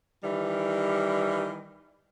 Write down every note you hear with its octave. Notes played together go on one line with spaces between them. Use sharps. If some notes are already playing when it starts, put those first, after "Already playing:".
D#3 E3 G3